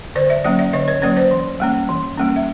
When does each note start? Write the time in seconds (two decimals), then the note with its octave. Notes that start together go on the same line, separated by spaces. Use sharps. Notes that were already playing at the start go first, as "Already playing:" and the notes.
0.15 D3 C5 D5
0.30 D5 E5
0.44 F#3 A#3 C#4 D5 E5
0.59 D5 E5
0.73 D3 C#5 D#5
0.88 B4 C#5
1.02 F#3 A#3 C#4 B4 C#5
1.17 C5 D5
1.31 E3
1.60 G3 A#3 C#4
1.89 E3
2.17 G3 A#3 C#4
2.36 E5